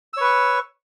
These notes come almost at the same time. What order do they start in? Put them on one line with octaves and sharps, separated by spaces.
E6 C#5 B4 C#6